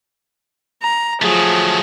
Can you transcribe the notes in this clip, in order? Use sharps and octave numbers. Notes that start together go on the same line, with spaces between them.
A#5
F3 F#3 A3 G#4